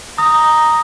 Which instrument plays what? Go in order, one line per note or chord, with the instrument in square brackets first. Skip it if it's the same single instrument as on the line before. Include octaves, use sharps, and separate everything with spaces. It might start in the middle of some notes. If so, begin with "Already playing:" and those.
[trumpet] A#5 [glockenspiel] D#6